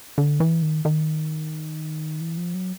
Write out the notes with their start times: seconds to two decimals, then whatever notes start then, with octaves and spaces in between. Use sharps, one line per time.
0.18 D3
0.40 E3
0.62 D#3
0.85 D#3
2.21 E3
2.37 F3
2.54 F#3